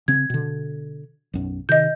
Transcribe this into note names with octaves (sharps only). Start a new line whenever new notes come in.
C#3 C4 G#6
B2 D3
B1 F#2
C3 D#3 D#5 G6